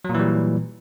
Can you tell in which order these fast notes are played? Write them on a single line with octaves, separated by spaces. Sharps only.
F#3 A#2 E3 G3